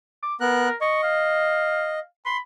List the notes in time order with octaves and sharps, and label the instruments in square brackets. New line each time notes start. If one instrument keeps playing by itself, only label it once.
[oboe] D6
[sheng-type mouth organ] B3 F#6 [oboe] A#4
[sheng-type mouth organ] D#5 [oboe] C#6
[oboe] F5
[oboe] B5 [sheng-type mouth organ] C6